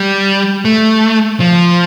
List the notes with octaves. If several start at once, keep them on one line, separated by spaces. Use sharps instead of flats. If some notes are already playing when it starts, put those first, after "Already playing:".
Already playing: G3
A3
F3